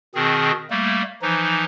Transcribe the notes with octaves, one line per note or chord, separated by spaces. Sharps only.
B2 D#3 C4 G#4
G3 A3 A#3
E3 F3 D#4